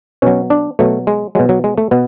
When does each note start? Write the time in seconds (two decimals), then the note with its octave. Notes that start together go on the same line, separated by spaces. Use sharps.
0.22 B2 F#3 C#4
0.50 D4
0.79 B2 F#3 A3
1.07 G#3
1.35 B2 F#3 G#3
1.49 F#3
1.64 G#3
1.78 A3
1.91 B2 B3